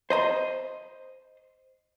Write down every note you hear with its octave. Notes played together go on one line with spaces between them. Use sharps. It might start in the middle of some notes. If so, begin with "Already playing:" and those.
C5 D#5 B5 C6